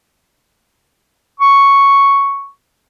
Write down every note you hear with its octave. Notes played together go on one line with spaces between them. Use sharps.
C#6